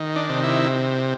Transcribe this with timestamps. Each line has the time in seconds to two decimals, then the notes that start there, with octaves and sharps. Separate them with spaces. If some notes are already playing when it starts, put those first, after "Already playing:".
Already playing: D#3
0.16 D4
0.29 C3
0.44 E4